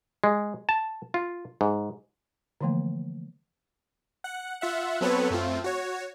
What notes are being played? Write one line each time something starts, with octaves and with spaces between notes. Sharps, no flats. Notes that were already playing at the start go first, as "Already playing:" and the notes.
G#3
A5
F4
G#2
D3 E3 F3 A3 A#3
F#5
F4 E5 F#5
F#3 B3 C4 A4 B4 C#5
F#2 A3 C4 F4
F#4 C#5